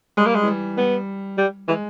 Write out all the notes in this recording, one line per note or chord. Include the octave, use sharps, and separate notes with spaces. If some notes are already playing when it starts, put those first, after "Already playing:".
G3 G#3
A#3
G#3
E3
G3
G3 B3
G3
E3 G#3